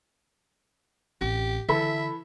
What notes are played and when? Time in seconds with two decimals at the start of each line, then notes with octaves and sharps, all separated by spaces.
1.21 A1 C4 G4
1.68 D3 E3 A4 E5 B5